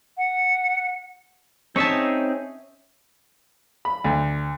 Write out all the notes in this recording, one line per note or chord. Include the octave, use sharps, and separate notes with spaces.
F#5
C4 C#4 D#4 G#4 C#5 E5 A5
B5
D2